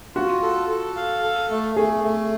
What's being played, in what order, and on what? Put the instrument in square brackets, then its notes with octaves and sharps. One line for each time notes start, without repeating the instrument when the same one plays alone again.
[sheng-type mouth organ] F4 [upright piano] F#4
[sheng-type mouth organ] A4
A4
F5
A4
A3
[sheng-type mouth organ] A3 [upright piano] G#4
[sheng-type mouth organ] A3